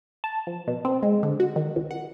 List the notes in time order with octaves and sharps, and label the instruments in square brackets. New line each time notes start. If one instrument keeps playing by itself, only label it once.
[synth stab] A5
F3
B2
C4
G#3
D3
F#4
D#3
C#2
F#5